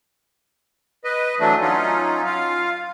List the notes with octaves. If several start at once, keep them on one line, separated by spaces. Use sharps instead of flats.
B4 D#5
E3 F#3 A3 D4
F#3 C#4 D#4 F4
F4 F5